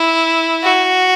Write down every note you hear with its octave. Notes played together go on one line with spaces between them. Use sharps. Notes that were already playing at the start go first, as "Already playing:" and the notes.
Already playing: E4
F#4